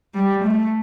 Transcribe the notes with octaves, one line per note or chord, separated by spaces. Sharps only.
G3
A3